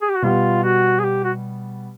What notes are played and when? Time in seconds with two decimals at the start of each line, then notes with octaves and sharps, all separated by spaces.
0.02 G#4
0.09 G4
0.16 F#4
0.22 B2 G3 B3 F4
0.63 F#4
0.99 G#4
1.04 G4
1.24 F#4